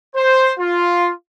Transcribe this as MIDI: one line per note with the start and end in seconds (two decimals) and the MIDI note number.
0.15 0.52 72
0.59 1.11 65